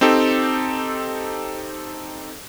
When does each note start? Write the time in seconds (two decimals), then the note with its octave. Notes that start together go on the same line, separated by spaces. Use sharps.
0.01 C4 D#4 G4 A4